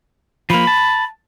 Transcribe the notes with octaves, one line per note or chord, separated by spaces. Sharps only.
F3 A#3 B5
A5